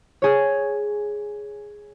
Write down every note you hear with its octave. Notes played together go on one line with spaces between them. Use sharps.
G#4 C#5